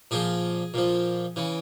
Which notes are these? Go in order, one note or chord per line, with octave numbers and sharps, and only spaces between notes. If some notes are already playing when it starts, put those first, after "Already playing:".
A#2 F3 G#4
A#2 F3
C#3 E3